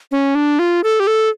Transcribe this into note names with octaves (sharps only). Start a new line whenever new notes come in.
C#4
D4
F4
A4
G4
A4